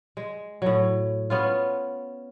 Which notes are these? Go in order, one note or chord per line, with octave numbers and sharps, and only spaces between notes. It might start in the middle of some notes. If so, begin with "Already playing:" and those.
G#3
A2 F#3
B3 C#4 F4